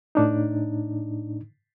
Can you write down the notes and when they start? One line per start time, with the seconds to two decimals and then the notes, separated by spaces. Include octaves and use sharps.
0.15 A2 D4 D#4